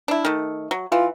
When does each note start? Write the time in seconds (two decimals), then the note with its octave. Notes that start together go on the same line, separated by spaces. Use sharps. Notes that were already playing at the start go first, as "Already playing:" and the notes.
0.08 D4 E4
0.25 D#3 A3
0.71 F#3
0.92 E3 F4